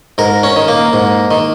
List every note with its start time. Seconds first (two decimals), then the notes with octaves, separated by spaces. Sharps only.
0.18 G#2 A#4
0.43 C#4
0.56 D#3
0.68 A#3
0.93 G#2
1.31 D#3